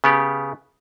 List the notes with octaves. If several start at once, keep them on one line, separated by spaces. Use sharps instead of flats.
C#3 B3 G4